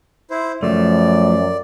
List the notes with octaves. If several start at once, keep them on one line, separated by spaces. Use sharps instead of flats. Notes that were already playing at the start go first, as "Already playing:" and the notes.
E4 C5
F#2 F3 A3 D5